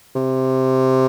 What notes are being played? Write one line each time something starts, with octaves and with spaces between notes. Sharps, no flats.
C3